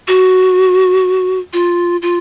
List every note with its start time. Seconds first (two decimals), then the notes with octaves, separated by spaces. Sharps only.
0.08 F#4
1.53 F4
2.02 F4